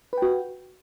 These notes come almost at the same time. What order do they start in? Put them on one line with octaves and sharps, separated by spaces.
B4 G5 F#4